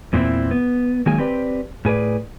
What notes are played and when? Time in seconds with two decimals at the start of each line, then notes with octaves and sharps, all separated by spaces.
0.13 E2 A#2 E3 A3 C4 E4
0.51 B3
1.06 D#3 F#3 G#3 A#3 G#5
1.18 C4 G4 B4 D5
1.85 A2 G#4 B4 D5